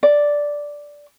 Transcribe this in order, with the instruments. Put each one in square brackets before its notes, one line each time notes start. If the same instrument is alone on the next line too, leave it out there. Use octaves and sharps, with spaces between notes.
[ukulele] D5